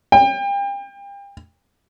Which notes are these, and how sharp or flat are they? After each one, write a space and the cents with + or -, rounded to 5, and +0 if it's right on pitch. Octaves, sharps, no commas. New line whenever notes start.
G5 +35